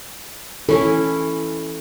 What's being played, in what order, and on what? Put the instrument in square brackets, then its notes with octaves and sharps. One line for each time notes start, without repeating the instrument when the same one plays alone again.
[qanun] E3 C#4 E4 [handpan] A4